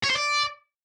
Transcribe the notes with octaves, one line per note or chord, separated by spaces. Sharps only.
C#5
C5
D5